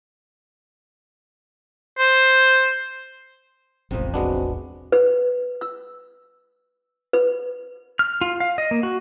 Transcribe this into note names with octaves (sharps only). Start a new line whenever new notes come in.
C5
E1 A1 F2 C3
G#3 B3 D4 F#4
B4
E6
B4
F6
F4
F5
D#5
A#3
F#4